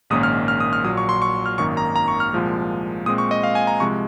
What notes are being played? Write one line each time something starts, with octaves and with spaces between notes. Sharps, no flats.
A#1 G#2 D#3 A#3 C#4 D#6
F6
F6
D#6
F6
A#1 A#2 F#3 D#6
C#6
C6
C#6
F6
G#1 F#2 D#3 A#3 C#6
A#5
A#5
C#6
F6
C2 A#2 F3 G#3
A#2 G#3 C4 D#6
C#6
D#5
F5
G#5
A#5
C2 C3 F3 G#3 C#6